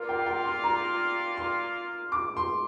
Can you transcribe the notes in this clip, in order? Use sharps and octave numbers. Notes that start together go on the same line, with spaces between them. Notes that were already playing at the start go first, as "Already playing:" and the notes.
Already playing: A#3 F4 A#4 D5 F5
G5
G5
C6
A#5
C6
D6
C6